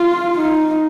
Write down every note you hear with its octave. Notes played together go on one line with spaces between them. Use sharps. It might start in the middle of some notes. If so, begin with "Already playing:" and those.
Already playing: F4
D#4